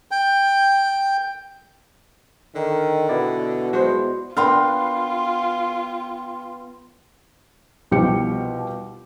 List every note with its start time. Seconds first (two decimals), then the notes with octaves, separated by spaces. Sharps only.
0.11 G5
2.56 D3 D#3
3.09 B2 B3 E4 D5
3.73 G#3 F#4 C5
4.37 B3 D4 F4 A#4 B4 G5 C6 F6
7.91 C2 B2 F3 G4 G5 C#7